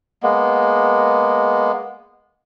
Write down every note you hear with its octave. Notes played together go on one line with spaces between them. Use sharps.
G#3 A#3 B3